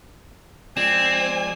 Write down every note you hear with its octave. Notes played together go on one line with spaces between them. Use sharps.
F3 G#3 C4 D5 G#5 E7